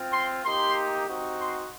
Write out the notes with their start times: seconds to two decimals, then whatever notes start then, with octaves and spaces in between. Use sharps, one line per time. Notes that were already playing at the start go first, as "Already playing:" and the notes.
Already playing: C4 F4
0.14 C6
0.45 A#3 D#4 G4 C6
1.08 C4 D#4 F#4
1.39 C6